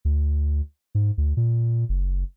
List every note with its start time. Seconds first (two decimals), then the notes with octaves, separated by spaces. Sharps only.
0.05 D2
0.95 G#2
1.18 D2
1.37 A#2
1.89 F#1